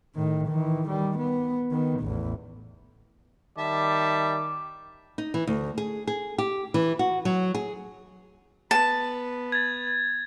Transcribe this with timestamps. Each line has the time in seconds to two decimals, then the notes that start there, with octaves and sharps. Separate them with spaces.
0.14 A2 D#3
0.48 D#3 E3
0.88 D#3 G3
1.18 B3
1.71 D#3 B3
2.01 A1 E2
3.58 D#3 G3 E5 A5 D6
5.18 D#4
5.34 E3
5.47 D2
5.78 G#4
6.07 G#4
6.38 G4
6.74 E3
6.99 F#4
7.25 F#3
7.55 G#4
8.71 B3 B4 A5
9.52 G#6 A6